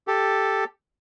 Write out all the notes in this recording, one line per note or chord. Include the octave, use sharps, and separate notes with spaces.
G4 A4